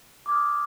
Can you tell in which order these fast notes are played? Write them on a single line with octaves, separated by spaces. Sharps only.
D6 G#6 F6 D#6